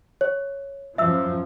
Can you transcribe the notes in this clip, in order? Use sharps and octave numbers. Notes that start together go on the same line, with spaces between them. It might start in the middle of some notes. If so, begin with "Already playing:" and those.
C#5
F#2 F3 E5 E6